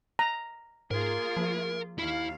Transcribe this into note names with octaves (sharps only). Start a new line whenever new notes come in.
A#5
G#2 A#3 F4 G#4 A#4
F3
D#2 E4 F5 B5